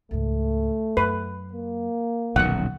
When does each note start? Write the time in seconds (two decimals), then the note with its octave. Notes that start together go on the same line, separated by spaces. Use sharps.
0.11 C#2 G#2 A3
0.97 F#2 B4
1.53 A#3
2.36 D#1 B1 D3 F#3 F#5